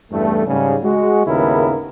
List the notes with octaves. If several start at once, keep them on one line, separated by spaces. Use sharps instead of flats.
A1 E2 G2 A3
G#2 C#3 G3
G#3 F#4
G#1 D#2 C#3 B3 E4 A#4